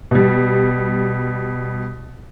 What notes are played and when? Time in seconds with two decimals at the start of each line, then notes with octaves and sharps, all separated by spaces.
0.11 B2 G3